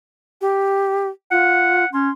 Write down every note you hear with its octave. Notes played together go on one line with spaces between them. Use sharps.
G4
F4 F#5
C#4 C6